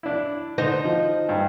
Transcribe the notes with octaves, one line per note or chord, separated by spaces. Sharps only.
D4 E4
D3 D#4 C5 D#5
F3
G2